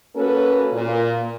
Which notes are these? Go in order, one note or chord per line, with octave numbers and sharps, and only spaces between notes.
A#3 C#4 F#4 A4 B4
A#2